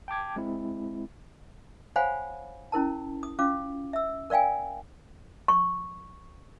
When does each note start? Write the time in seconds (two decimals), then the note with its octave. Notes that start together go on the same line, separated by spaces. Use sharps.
0.08 G5 A5 D6 G#6
0.36 G#3 C4 E4
1.96 C5 C#5 F5 F#5 G#5 B5
2.72 C#4 E4 A#4 A5
3.23 D#6
3.39 C#4 F4 F5 D6
3.93 E5 E6
4.30 A#4 D5 F5 G5 G#5
5.48 C#6